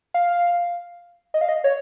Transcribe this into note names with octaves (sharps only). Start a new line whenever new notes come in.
F5
D#5
F5
D#5
C#5